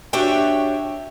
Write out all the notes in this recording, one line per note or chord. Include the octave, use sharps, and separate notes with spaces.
D4 F#4 G4 C#5 E5 G5